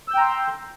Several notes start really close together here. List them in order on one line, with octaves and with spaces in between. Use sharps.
E6 G6 G5 A#5 C6